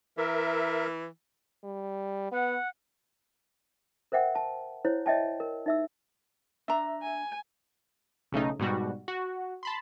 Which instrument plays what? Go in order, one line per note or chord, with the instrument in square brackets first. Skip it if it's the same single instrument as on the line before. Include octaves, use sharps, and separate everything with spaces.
[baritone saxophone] E3 [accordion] A#4 E5
[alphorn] G3
[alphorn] B3 [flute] F#5
[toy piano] A#4 C5 E5 F#5 G5
A5
E4 C5 C#5
C#5 D#5 E5 G5 A5
A#4
D#4 E5 E6
[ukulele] D4 A#5 [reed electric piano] E5
[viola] G#5
[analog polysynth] B1 C#3 A3 D#4
G#2 B2 G3 F#4
F#4
A5 B5 C6